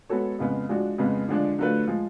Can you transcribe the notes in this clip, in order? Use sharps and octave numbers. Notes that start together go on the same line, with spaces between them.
G#3 B3 F#4 A4 C#5
F2 C#3 G#3 B3
F3 G#3 D4 F#4
F2 C#3 G#3 B3
D3 F3 G#3 D4
D3 F#3 A3 F4 B4
F3 G#3